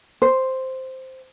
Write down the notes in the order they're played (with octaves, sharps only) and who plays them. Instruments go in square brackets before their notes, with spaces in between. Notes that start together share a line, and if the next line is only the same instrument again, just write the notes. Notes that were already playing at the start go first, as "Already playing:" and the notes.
[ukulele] C5